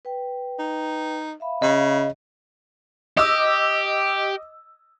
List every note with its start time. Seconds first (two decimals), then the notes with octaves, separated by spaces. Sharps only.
0.05 B4 G5
0.59 D#4
1.40 E5 F5 B5
1.62 C#3 D#5
3.17 G4 D#5 D6 E6